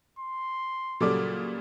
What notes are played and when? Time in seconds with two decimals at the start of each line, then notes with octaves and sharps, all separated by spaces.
0.19 C6
1.00 A#2 C#3 F#3 G3 A4 D6